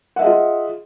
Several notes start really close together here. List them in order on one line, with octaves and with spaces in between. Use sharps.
F#5 E5 D#5 G#4 F4